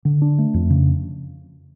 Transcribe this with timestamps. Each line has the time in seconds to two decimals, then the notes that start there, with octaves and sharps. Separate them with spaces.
0.05 D3
0.22 D4
0.38 A3
0.54 F2
0.70 C#3